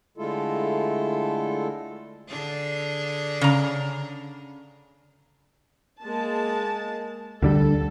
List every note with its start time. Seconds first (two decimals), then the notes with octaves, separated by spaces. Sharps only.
0.18 D3 G#3 A3 E4 F4 A4
2.29 D3 D4 G#4
3.41 C#3 A#5
6.02 G#3 A#3 A5
7.42 D2 D3 G3 A4